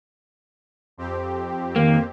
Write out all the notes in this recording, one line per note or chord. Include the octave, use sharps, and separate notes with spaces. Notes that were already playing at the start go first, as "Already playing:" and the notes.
F2 C4 G4
D#3 A#3